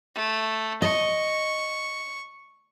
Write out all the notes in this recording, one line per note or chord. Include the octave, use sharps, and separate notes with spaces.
A3
D#5 C#6